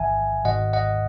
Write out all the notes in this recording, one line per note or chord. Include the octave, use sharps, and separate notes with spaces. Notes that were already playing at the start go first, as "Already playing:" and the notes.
Already playing: A1 G#2 D#3 E5 F#5 G#5 A5
G#1 G#2 D#3 D#5 F#5
D#5 F#5